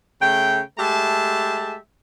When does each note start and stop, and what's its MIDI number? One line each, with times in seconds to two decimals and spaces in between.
0.21 0.61 49
0.21 0.61 57
0.21 0.61 79
0.79 1.77 56
0.79 1.77 57
0.79 1.77 67
0.79 1.77 76
0.79 1.77 81